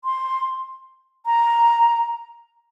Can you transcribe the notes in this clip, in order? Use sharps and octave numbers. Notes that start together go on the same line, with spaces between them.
C6
A#5